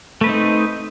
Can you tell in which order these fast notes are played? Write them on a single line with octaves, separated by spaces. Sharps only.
A3 B4 C4 D#4